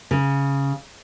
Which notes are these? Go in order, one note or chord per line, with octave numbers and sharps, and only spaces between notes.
C#3